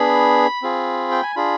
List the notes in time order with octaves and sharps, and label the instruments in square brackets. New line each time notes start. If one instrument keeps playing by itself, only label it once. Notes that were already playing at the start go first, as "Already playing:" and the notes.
Already playing: [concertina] B3 D4 G#4 B5
C4 F4 G#4
G5
G#5
D4 F4 G#4 B5